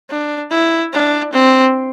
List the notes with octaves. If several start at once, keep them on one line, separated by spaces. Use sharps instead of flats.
D4
E4
D4
C4